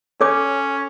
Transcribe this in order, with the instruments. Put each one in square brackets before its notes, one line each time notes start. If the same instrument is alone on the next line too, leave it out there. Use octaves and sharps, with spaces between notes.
[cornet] C#4 [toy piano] A4 C#5 D6